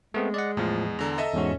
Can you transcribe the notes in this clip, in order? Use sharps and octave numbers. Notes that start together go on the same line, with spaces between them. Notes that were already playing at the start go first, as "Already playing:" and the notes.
G#3 A3 B3 C4
D5 D#5 F#5
E2 A2 F3
E2 D3 A#5
A4 D#5 E5
E2 G#2 C#4 F#4